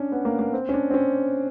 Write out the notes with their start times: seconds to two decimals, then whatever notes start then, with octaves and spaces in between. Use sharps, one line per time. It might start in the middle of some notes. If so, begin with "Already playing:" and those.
Already playing: C#4 D4
0.12 B3
0.25 A#3
0.39 A#3
0.53 C4
0.69 C#4
0.74 D4
0.90 C4
0.94 C#4